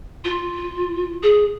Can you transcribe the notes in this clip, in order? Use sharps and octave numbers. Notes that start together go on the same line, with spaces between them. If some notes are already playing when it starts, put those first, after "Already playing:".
F4
G#4